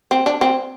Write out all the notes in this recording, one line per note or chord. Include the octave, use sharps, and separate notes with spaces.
C4
D4
C4